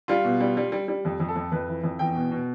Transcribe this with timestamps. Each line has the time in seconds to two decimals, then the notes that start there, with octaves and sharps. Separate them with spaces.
0.08 G3 F4
0.25 B2
0.40 G3
0.57 G3
0.72 G3
0.88 G3
1.05 F2
1.20 F2
1.28 A4
1.36 F2
1.52 F2 B4
1.68 E3
1.84 F2
1.99 E2 G5
2.15 B2
2.31 B2